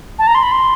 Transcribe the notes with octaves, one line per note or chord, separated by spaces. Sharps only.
A5
A#5
C6
B5
C6